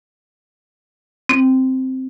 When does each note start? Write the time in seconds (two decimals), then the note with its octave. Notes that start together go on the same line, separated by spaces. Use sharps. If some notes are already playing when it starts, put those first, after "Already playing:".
1.29 C4